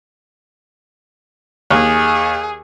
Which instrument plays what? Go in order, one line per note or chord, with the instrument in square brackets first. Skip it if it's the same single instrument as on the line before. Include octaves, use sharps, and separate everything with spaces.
[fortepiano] D#2 [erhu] G#4